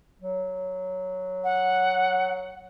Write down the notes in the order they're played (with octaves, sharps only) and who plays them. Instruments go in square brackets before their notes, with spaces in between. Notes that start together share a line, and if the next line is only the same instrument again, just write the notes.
[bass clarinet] F#3
[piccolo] F#5